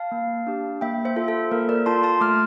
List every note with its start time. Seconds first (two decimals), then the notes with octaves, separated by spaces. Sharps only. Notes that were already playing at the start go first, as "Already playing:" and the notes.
Already playing: F5 A5
0.12 A#3
0.47 D4 G4
0.81 A#3 E5 G5
1.05 C5 E5
1.16 F4 A4
1.28 A4
1.51 A#3 A#4
1.69 A#4 D5
1.86 F4 A4 A5 C6
2.03 A5 C6
2.21 A3 D6 F6